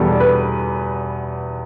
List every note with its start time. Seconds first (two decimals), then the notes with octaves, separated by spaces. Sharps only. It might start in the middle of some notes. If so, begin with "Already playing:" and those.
Already playing: E2 B2 G3 A4
0.11 D5
0.20 B4